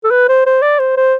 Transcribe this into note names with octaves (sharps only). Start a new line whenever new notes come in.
A4
B4
C5
C5
D5
C5
C5